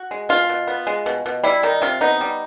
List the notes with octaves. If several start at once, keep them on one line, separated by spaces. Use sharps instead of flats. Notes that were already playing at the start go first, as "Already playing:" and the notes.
Already playing: F#4
G#3
B2 F4
B2
B3
G#3
B2
B2
G3 E4
D#3 D#4
C3 F4
B3 D#4
G3